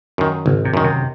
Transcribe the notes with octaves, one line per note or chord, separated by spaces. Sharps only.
F#2 D#3
G#1 C#3
C3
F#2 D#3
C3